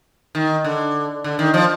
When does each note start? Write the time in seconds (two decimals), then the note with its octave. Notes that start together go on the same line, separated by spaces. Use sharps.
0.35 D#3
0.65 D3
1.24 D3
1.39 D#3
1.54 F3